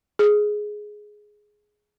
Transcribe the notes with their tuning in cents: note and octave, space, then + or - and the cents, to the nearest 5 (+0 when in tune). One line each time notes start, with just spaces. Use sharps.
G#4 +5